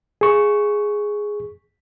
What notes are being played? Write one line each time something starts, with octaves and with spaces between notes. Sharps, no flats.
G#4 C#6